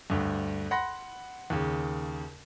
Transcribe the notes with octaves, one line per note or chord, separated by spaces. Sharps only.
D2 G2
F#5 B5 C6 A#6
D#2 C#3